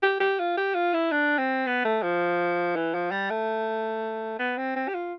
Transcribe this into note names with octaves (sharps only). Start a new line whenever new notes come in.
G4
G4
F4
G4
F4
E4
D4
C4
B3
A3
F3
E3
F3
G3
A3
B3
C4
C4
G4
F4